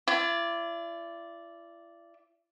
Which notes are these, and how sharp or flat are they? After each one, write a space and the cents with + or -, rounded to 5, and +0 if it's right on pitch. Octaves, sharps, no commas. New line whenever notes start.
E4 +40 D5 -5